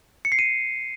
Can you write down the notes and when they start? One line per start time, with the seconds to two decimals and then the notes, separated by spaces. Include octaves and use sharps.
0.25 C#7
0.32 C7
0.39 D#7